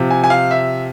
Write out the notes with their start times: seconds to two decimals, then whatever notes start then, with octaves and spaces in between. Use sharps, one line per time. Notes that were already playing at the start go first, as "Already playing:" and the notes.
Already playing: C3 F3
0.11 G#5
0.24 G#5
0.30 F5
0.51 E5